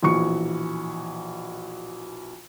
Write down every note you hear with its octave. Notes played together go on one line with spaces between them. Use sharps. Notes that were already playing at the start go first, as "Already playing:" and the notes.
A#1 B2 E3 C#6 C#7